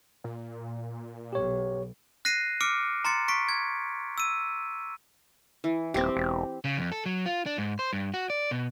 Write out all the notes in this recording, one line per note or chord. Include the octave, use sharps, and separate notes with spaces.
A#2
B1 G4 C#5
F#6 A#6 C7 D#7
D6 F6 C#7 D7
A#5 C6 A6 C#7
C#6 B6 D7
G#6
E6 D#7
E3
D#1 C4 G4
E1
C#3
F2
A4
F#3
F4
D4
G#2
C5
G2
F#4
D5
B2